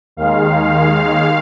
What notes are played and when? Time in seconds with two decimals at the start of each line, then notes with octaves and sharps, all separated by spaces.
0.17 D#2 D#3 G#3 F5